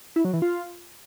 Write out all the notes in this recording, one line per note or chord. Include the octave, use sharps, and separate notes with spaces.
E4
F#3
E3
F4